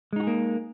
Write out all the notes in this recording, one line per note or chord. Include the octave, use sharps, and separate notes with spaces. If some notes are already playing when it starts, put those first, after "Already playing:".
G#3 A#3 D#4 F#4 G#4